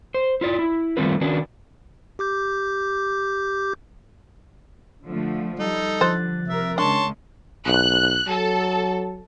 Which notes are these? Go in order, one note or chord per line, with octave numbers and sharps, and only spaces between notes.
C5
E4 F4 D5
E4
D#3 G3 A3 C4 F4 B4
D#3 C#4 D4 F#4 B4
G4 D6 G6
D3 F3 A3
G3 D#4 A4
D3 F3 C5 F#6 A6
C3 A#4 E5
C#3 G#3 D4 C#5 A5 C6
B1 F#6
F#3 A4 A5